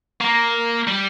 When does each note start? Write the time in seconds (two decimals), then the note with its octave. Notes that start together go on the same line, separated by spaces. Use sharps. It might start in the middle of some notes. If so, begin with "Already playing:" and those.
0.21 A#3
0.87 G3